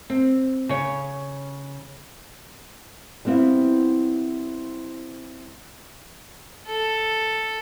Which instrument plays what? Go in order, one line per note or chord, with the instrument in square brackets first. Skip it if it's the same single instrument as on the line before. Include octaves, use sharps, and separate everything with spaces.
[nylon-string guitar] C4
C#3 C#5
G3 B3 C4 E4 F5
[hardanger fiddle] A4